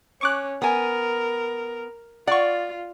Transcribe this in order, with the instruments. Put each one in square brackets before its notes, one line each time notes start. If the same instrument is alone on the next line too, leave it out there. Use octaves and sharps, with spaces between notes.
[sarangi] C#4 [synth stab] C#6 D6 F#6
[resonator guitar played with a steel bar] B3 G#5 [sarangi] A#4
[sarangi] F4 [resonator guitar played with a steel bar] D5 [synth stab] F#5 C#6